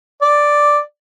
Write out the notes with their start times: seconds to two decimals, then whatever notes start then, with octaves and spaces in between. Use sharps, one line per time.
0.22 D5